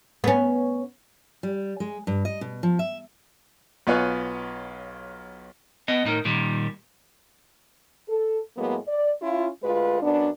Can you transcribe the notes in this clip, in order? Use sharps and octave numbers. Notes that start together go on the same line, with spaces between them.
B3 C#4
G3
G#3
G2
D#5
B2
F3
E5
B1 B3 F4 C#5 G#5 F#6
B3 D#5
A2 D#4 A#4
A#2 D#3 G3
A4
A2 F#3 G#3 A#3 B3
D5
C#4 E4 F4
D2 G#3 F4 B4
F#2 B3 D4